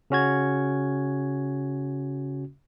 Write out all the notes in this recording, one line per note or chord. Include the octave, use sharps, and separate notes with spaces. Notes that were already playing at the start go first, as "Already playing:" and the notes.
C#3 C#4 F#4 G#6